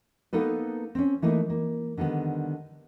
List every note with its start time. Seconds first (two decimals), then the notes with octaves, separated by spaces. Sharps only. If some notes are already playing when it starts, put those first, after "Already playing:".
0.33 A#3 B3 D#4 A4 B4
0.95 C4 C#4
1.22 E3 A3 A#3 D#4
1.50 A#3
1.97 D3 D#3 G3 B3